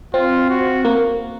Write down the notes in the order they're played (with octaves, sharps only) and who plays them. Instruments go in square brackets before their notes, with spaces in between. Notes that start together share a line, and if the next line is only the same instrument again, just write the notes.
[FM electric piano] C4 [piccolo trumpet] F4
[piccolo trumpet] F#4
[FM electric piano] A#3